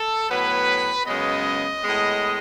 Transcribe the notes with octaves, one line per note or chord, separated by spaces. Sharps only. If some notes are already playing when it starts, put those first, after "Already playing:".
Already playing: A4
A2 F#3 B3 B4
F#2 C#3 G#3 B3 D#5
A2 G#3 B3